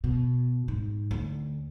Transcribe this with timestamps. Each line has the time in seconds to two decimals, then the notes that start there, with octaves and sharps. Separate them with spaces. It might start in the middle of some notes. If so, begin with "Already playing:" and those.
0.04 B2
0.68 G#2
1.11 D2